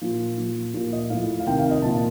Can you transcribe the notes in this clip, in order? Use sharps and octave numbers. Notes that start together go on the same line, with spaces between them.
A#2 F3
A#2 F3
A#2 F3 F4
D#5
A2 F3 F5
F5
C3 D#3 G5
F5
D#5
A#2 F3 A5